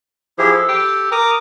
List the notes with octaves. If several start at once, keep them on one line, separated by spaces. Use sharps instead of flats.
F3 E4 G4 G#4
A4
G4
A#4 A#5 D6 D#6